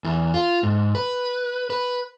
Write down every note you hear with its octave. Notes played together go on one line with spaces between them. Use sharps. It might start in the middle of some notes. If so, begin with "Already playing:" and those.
E2
F4
G#2
B4
B4